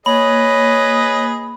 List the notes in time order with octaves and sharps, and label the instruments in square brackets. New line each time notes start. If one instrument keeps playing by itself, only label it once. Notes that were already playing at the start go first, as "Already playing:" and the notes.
[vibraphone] A#3 [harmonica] G#4 B4 D#5 [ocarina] C#5 [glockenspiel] B5